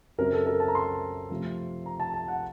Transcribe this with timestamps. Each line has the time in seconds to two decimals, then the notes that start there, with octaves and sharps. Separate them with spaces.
0.18 F#2 C#3 F#3 C4 A#4
0.33 A4
0.46 A#4
0.60 A5
0.68 A#5
0.75 C6
1.30 C3 F3 A3 C4
1.86 A#5
2.00 A5
2.14 A5
2.28 F#5